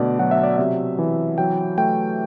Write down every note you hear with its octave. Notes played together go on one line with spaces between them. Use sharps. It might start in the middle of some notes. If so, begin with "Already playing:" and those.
Already playing: B2 D3 A3 D5
F#3 F#5
E5
D5
C3 E5
E3
F#3 G5
A3 G5